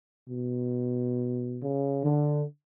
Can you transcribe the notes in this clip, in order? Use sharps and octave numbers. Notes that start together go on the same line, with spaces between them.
B2
C#3
D3